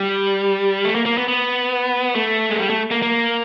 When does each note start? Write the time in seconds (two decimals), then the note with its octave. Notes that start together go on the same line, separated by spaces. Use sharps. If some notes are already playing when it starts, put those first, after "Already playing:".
Already playing: G3
0.84 A3
0.95 A#3
1.06 A#3
1.17 B3
1.28 B3
2.15 A3
2.50 G#3
2.59 G3
2.70 A3
2.91 A#3
3.02 A#3